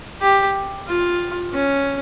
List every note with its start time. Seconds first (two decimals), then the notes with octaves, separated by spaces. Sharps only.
0.21 G4
0.87 F4
1.53 C#4